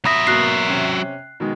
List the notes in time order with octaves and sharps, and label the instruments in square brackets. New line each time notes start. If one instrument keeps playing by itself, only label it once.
[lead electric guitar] F#3 E5 [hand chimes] B5 D#6 A#6
[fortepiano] B2 A#3 [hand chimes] F#6 C7
[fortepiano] C3 C#4
B2 D#3 G#3